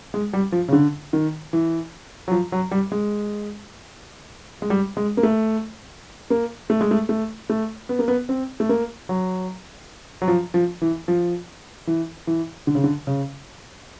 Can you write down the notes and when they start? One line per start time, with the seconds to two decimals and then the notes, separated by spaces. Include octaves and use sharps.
0.14 G#3
0.33 G3
0.52 F3
0.68 C#3
0.73 D3
1.13 D#3
1.53 E3
2.28 F#3
2.31 F3
2.52 F#3
2.71 G3
2.92 G#3
4.62 G#3
4.70 G3
4.97 G#3
5.17 A#3
5.23 A3
6.30 A#3
6.70 A3
6.81 G#3
6.91 A3
7.09 A3
7.50 A3
7.89 B3
7.99 A#3
8.08 B3
8.29 C4
8.60 A3
8.69 A#3
9.09 F#3
10.22 F#3
10.28 F3
10.54 F3
10.82 E3
11.08 F3
11.87 E3
12.27 E3
12.67 D3
12.75 C#3
12.84 D3
13.07 C#3